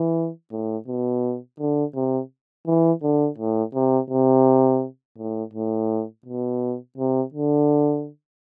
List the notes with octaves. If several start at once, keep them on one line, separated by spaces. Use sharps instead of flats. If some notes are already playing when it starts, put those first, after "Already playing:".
Already playing: E3
A2
B2
D3
C3
E3
D3
A2
C3
C3
A2
A2
B2
C3
D3